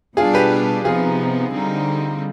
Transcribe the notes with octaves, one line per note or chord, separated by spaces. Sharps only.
B2 G3 D4 F4 G#4
G4 B4
C3 F3 B3 D#4 F4 G#4
D3 G3 C4 D#4